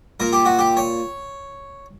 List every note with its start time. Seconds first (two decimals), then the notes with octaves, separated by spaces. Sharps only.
0.20 A#2 A#4
0.33 G4
0.46 F#4
0.59 G4
0.77 C#5